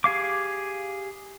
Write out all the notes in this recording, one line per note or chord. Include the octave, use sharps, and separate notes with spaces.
G4 G#4 F5 D6